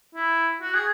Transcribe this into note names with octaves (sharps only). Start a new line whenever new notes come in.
E4
F#4
G#4